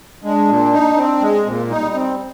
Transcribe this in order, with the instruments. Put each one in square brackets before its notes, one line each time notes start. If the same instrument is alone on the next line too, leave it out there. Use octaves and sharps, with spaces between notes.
[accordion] G#3 [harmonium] D4
[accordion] A#2
D#4
C4
G#3
[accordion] A#2 [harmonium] C4
[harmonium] A#3
G#3
[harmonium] G3 [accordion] D#4
[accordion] C4